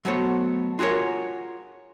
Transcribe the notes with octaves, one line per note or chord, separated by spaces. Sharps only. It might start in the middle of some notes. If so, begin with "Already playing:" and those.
F#3 A3 B3 C5 C#5
F4 F#4 G#4 A#4 C#5